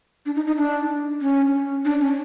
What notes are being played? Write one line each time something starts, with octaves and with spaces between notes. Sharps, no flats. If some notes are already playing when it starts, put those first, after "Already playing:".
D4
D#4
D#4
D4
C#4
D4
C#4